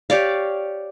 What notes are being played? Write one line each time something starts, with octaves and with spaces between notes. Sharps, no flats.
G4 C#5 D5 F5